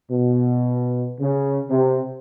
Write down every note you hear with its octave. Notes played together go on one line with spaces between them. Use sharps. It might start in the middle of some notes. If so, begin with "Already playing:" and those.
B2
C#3
C3